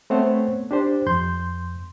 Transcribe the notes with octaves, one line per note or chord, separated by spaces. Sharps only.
A3 B3 C4 C5 C#5 F#5
D4 G4 C5
F2 C6 G6